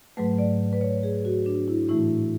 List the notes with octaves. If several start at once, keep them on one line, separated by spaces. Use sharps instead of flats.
G#2 F#3 A3 B4
D5
B4
C#5
G#4
F#4
D4
E4
A2 E3 A3 E4